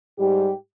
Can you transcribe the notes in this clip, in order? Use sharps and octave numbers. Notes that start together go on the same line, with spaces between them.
G#2 G3 G4